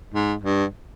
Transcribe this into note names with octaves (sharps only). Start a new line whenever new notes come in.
G#2
G2